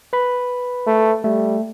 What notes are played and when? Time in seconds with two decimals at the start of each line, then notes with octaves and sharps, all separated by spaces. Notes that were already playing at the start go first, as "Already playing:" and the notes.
0.13 B4 B5
0.87 A3
1.24 G3 A3